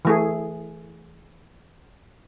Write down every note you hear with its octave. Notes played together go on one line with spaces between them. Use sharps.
E3 A3 G#4